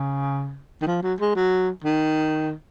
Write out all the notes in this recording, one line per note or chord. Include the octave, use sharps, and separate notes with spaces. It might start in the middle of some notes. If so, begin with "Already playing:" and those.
Already playing: C#3
D#3
F3
F#3
G#3
F#3
D#3